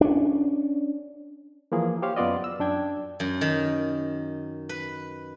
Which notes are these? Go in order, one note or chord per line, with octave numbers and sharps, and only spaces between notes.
C#4 D4
E3 F3 A#3 G#4
G4 C5 C#5 F5
F#2 B3 F4 D5 D#5
E6
F#2 D4 G5 G#6
F#2
D#3
B4